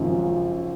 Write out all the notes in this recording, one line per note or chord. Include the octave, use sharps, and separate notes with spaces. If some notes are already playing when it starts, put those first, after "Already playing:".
Already playing: G#1 F#2 C#3 F3